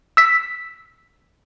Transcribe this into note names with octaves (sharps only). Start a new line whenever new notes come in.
E6 B6